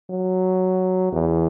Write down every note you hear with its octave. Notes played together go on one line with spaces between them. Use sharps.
F#3
E2